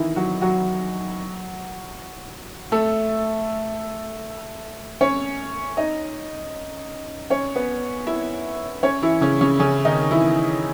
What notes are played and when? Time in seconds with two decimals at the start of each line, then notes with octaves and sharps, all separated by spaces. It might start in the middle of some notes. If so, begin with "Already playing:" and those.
Already playing: D#3 E3 D#4 E4
0.16 F#3 F#4
0.41 F#3 F#4
2.72 A3 A4
5.01 C#4 C#5
5.77 D#4 D#5
7.30 C#4 C#5
7.55 B3 B4
8.07 E4 E5
8.83 C#4 C#5
9.02 E3 E4
9.21 C#3 C#4
9.41 C#3 C#4
9.60 C#3 C#4
9.85 D#3 D#4
10.10 E3 E4